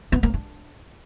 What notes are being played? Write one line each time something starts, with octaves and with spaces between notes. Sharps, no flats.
B3
A#3
D4